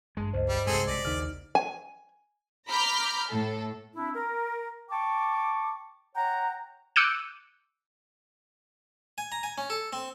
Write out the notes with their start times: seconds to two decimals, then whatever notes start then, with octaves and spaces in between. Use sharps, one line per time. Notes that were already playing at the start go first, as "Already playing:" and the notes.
0.17 A1 G2 G#3 A5
0.33 C#2 C5 D#5
0.49 G3
0.67 C2 G#2 C4 G#4 A4
0.87 B1 D5 A#6 B6
1.05 A#1 D#2 C#3 D#4 F6
1.55 G#5
2.69 A#5 B5 D6 F6 G6
3.28 A2 A4
3.95 C4 D4 E4
4.15 A#4
4.90 G5 A5 C#6 D6
6.15 C#5 F#5 G5 A#5
6.96 D6 E6 F#6 G6 C#7 D#7
9.18 G#5
9.32 A#5
9.43 G#5
9.58 C#4
9.70 A4
9.93 C4